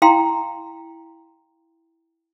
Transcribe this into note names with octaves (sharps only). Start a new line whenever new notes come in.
E4 F5 G5 A#5 C6